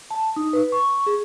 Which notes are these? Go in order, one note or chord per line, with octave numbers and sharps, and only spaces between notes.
A5
D#4
B4
C#6
G#4